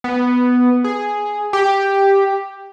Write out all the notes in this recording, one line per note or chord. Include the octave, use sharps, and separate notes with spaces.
B3
G#4
G4